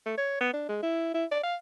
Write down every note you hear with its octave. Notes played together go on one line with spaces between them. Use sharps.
A3
C#5
B3
D4
G#3
E4
E4
D5
F5